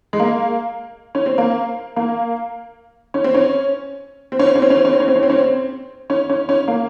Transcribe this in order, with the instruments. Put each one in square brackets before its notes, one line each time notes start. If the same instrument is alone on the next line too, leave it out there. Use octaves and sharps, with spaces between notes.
[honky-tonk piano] G#3
A#3
C#4
C4
A#3
A#3
C#4
C4
C#4
C4
C#4
C4
C#4
C4
C#4
C4
C#4
C4
C#4
C4
C#4
C4
C#4
C4
C#4
C#4
C#4
A#3